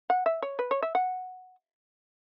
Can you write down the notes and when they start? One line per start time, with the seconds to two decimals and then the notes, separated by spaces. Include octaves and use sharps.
0.10 F#5
0.26 E5
0.42 C#5
0.59 B4
0.71 C#5
0.82 E5
0.95 F#5